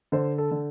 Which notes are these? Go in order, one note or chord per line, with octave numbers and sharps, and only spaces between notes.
D3 C5
A4
D3